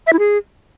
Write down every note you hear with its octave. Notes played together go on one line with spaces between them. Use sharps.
E5
E4
G#4